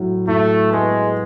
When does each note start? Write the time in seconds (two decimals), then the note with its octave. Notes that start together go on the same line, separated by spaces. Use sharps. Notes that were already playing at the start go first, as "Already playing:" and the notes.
Already playing: A2 F#3
0.27 A2 A3
0.71 G#3 B3